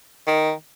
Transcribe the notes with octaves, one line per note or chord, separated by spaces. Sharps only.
D#3